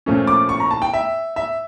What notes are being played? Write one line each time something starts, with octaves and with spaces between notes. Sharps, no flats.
A#2 F3 A3 C#4
D6
C#6
A#5
A5
G5
E5
E5